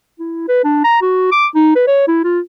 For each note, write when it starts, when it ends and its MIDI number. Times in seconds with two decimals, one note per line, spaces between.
0.19 0.44 64
0.48 0.61 71
0.64 0.83 62
0.84 1.01 82
1.02 1.30 66
1.31 1.46 86
1.55 1.72 63
1.75 1.84 71
1.87 2.06 73
2.07 2.22 64
2.24 2.40 65